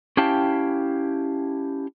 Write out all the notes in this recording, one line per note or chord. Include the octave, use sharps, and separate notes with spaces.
C#4 E4 G4 F5 G5 A5